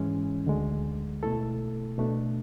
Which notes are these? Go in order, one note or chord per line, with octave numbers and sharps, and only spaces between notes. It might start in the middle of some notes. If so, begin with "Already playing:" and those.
Already playing: G#2 E3 G#3 C#4
D2 D3 G#3
B2 A3 E4 A4
B2 A3 D4